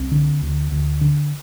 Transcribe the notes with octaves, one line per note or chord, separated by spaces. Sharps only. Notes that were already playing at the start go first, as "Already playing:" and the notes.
Already playing: C2 C4
D3
D2
D2
D3